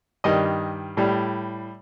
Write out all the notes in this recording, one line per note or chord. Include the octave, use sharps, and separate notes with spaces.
G2 D#3 G3 D#5
A2 G3